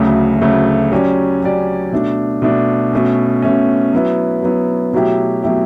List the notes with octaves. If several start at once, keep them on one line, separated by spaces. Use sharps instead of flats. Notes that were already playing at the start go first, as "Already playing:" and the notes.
Already playing: D2 C#3 F#3 A3
D2 C#3 F#3 A3
F#3 C#4 G4 D5
F#3 C#4 G4 D5
B2 A3 D4
B2 A3 D4
B2 A3 C#4
B2 A3 C#4
F#3 B3 E4
F#3 B3 E4
B2 F#3 A3 E4 G4
B2 F#3 A3 E4 G4